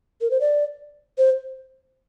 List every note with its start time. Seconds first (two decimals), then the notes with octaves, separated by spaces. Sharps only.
0.21 A#4
0.31 C5
0.41 D5
1.18 C5